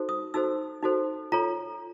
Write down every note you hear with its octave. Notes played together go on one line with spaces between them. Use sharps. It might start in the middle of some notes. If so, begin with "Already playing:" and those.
Already playing: D#4 F#4 A4 C5
D#6
D#4 F#4 A4 C5 E6
D#4 F#4 A4 C5
F4 A4 C#5 A#5